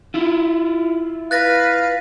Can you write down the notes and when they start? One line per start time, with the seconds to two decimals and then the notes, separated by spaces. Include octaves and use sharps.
0.14 E4 F4
1.31 B4 F5 F#6 A6 A#6